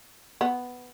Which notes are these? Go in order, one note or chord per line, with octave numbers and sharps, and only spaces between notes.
B3